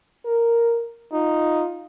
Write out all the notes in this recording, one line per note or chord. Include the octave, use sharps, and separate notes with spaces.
A#4
D#4 F4